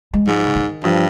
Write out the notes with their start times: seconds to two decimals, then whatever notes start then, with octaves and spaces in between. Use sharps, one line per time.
0.14 G#3
0.27 G#2 F3
0.45 C#3
0.56 D#3
0.83 G2 F3